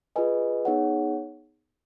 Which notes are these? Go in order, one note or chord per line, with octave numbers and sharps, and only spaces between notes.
F4 G#4 B4 D#5 G#5
B3 D#4 G#4 C#5 F#5